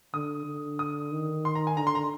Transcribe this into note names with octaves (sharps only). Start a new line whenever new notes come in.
D3 D#6
D3
D#6
D#3
C6
A#5
G#5
D3 A#5
C6
A#5